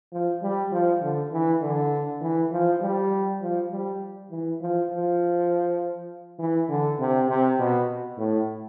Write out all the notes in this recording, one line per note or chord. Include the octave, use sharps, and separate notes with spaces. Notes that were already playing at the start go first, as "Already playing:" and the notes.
F3
G3
F3
D3
E3
D3
E3
F3
G3
F3
G3
E3
F3
F3
E3
D3
C3
C3
B2
A2